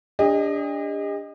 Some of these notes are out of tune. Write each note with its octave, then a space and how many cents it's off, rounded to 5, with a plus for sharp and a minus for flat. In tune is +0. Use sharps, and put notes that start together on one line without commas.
D4 -20 G4 +45 D#5 +0